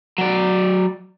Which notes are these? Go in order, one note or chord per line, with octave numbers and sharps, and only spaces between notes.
F#3 D5